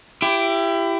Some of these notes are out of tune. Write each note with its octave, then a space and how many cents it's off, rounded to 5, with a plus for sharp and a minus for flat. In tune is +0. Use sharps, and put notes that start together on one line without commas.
E4 +25 G4 +0